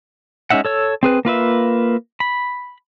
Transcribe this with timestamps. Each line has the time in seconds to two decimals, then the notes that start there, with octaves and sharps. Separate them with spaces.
0.50 G#3 C#4 D#4 E5 F#5
0.65 A4 C#5 E6
1.03 C4 G#4 B4
1.25 A#3 F4 B4 E5
2.20 B5